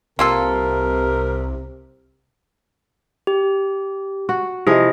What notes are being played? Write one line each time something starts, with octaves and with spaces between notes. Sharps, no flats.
C2 C3 A#3 F4 A4 A#4
G4
F#4
C3 F3 E4 G#4 D#5